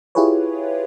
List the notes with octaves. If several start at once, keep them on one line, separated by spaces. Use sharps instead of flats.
E4 F4 G4 G#4 B4 C#5